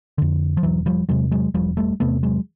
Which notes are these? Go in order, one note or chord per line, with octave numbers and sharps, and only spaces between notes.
F2 D3
F3
E1 E3 F#3
F3 G3
E2 C3 F#3 G#3
F#3 G#3
E1 F3 G3
G3 A3
E2 C3 A3 B3
F#3 G#3